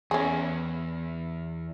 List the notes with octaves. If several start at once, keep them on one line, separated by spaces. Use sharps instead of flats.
E2 C#4 G#4